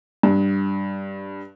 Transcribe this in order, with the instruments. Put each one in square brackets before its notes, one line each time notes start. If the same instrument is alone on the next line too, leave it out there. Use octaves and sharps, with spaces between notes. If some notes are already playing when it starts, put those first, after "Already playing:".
[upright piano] G2